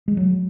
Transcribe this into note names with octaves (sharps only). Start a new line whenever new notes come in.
G#3
F#3